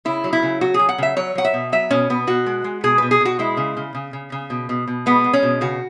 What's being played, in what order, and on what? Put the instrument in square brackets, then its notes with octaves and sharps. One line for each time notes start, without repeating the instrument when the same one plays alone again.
[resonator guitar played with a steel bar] C#3 E4
F#3
E4
C#3
F#3 F#4
F#3 G#4
F#5
C#3 E5
F#3 C#5
F#3 F#5
E5
B2
F#3 E5
B2 C#4
B2 B3
B2 F#4
G#3
G#3
B2 G#4
B2 B4
G#4
B2 F#4
G#3 E4
C#3
C#3
C#3
C#3
C#3
B2
B2
B2
G#3 B3
G#3
C#4
B2
C#3 F#4